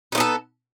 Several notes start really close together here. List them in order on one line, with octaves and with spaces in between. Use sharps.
D#4 A3 B3 A4